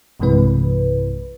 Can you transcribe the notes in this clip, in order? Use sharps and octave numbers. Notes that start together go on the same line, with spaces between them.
B1 G2 C3 E3 G#3 B4